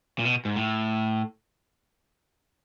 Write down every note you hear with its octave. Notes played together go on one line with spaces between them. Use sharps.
A#2
B2
G#2
A2